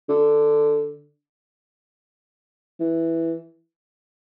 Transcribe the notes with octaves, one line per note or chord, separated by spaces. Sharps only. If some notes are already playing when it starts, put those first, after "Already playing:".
D3
E3